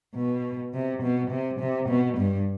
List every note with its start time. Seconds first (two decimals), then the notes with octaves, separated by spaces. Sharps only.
0.16 B2
0.74 C3
1.02 B2
1.31 C3
1.60 C3
1.89 B2
2.17 G2